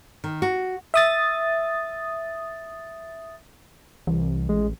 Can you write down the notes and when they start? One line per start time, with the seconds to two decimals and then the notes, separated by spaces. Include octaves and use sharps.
0.24 D#3
0.42 F#4
0.94 E5 D#6 A6
4.07 C2 E3
4.49 A1 G#3